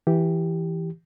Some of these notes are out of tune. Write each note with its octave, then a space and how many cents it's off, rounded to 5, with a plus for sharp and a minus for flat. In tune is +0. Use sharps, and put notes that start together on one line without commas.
E3 +0 G4 +0